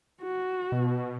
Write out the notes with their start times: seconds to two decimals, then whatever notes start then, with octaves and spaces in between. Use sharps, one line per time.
0.23 F#4
0.72 B2